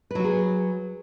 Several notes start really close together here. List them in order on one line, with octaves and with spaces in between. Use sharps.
B4 F#3 F#4 G#4